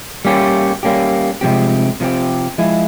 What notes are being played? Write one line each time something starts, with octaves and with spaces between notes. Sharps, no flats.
G3 A#3 C#4 G4
G3 A#3 C#4 G4
C3 F3 G#3 C4 G4
C3 F3 G#3 C4 G4
F3 G#3 E4 G#4